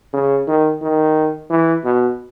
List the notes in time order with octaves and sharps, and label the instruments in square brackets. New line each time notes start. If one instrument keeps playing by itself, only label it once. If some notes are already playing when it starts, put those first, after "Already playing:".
[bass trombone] C#3
D#3
D#3
E3
B2